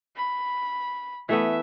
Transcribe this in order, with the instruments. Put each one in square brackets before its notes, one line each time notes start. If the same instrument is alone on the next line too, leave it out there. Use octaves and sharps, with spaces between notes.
[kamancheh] B5
[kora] E3 A3 B3 [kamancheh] E5